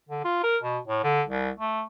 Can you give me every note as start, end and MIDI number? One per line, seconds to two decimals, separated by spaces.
0.09 0.24 50
0.24 0.43 65
0.44 0.57 70
0.63 0.78 47
0.87 1.02 45
1.04 1.22 50
1.27 1.50 36
1.59 1.83 57